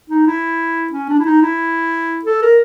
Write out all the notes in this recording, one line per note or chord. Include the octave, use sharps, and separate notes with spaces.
D#4
E4
C#4
D4
E4
D#4
E4
A4
A#4